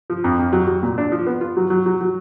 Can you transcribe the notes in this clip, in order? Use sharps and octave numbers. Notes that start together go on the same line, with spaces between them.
F3
F2
F2
F#3
F#3
A#2
D4
F3
B3
F4
F#3
F#3
F#3
F#3